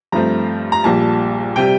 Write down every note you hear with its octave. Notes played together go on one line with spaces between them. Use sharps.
G2 F3 A3 C4 A#5
A#5
A#1 A#2 G3 A5
C3 G3 G5